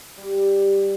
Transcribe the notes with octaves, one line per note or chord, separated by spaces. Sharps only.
G3
G4
G3